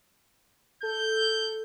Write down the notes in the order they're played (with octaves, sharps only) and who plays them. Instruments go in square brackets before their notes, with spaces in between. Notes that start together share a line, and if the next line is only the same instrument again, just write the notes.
[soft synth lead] A4 [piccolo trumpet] G6